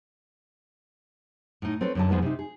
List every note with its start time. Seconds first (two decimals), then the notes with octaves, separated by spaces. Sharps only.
1.62 A2 D#4
1.81 C4 A4 B4 C#5
1.95 F#2 D3 A5
2.09 F2 F3 G#3 B3 D#4
2.22 C3 D#4
2.39 G#4